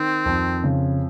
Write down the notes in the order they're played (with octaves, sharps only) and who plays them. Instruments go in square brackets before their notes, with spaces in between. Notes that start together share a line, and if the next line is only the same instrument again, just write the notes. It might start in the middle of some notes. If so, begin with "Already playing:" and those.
Already playing: [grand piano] D#3 [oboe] C4
[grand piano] F2
C#3